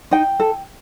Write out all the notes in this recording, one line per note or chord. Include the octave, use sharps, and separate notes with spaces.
D#4 G5
A4